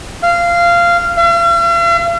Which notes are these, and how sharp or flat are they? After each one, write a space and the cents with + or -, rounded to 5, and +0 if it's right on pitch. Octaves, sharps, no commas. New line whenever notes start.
F5 -15
F5 -45